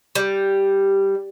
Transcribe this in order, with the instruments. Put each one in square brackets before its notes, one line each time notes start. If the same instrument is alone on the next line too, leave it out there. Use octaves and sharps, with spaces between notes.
[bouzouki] G3